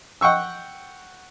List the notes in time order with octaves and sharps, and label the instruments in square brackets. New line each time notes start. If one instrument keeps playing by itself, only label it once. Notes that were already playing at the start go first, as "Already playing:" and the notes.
[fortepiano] F#5 G5 C#6 E6